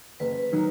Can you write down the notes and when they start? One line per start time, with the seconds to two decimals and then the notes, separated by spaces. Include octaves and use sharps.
0.20 F#1 B4
0.52 D#3 F#3 D#4